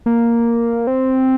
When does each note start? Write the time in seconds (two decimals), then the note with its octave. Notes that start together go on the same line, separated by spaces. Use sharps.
0.06 A#3
0.87 C4